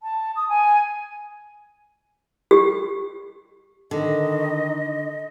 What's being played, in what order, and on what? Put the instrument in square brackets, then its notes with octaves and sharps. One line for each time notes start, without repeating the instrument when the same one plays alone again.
[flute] A5
D#6
G#5
[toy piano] G4
[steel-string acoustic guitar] D3 [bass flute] D#3 [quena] D#5